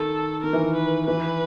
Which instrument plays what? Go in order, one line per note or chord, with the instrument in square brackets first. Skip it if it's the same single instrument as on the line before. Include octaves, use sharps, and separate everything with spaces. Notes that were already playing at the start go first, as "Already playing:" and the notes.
Already playing: [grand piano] D#3 [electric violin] A4
[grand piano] D#3 [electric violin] A#4
[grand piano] E3
D#3
[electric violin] B4
[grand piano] E3 [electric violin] B4